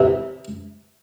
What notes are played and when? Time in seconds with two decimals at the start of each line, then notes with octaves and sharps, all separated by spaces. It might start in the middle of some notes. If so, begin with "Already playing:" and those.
Already playing: C3 E3